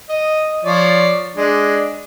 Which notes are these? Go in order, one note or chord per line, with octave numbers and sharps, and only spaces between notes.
D#5
F3 C#5 D5
G#3 D4